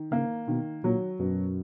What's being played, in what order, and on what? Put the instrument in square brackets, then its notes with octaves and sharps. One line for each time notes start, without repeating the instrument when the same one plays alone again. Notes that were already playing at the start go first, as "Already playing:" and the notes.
Already playing: [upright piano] D#3
[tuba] C#3 [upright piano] A#3
[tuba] B2 [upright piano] D#3
[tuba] A#2 [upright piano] F#3
[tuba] F#2 [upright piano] B2